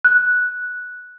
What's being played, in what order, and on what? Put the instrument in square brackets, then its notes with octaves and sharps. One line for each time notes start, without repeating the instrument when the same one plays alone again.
[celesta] F#6